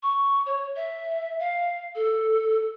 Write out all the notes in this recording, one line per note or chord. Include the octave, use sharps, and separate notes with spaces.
C#6
C#5
E5
F5
A4